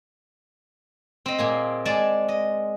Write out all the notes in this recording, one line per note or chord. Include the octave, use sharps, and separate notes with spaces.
C4 D#5
A#2 A#3 G#4
G#3 D5 G#5 A5
D#5